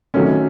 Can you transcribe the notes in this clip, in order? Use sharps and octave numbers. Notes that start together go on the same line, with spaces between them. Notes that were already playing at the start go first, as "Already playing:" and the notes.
C3 D#3 F#3 A3 C#4